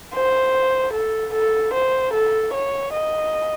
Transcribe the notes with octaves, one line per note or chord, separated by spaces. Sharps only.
C5
A4
A4
C5
A4
C#5
D#5